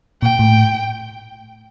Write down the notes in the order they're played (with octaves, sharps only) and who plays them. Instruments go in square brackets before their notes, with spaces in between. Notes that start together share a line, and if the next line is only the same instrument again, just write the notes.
[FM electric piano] A#2 [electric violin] G5
[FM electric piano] A2